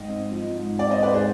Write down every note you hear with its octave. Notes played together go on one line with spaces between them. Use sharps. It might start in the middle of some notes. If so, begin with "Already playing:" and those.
Already playing: G#2 D#5 G5
C4
F3
G#2
C4 D5 F5
C5 D#5
G#2 B4 D5
G#4 C5